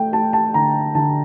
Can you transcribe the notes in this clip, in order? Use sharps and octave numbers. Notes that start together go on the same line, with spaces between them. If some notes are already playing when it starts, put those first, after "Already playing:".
Already playing: A3 G5
A3 A5
A5
D3 A#5
D3 A5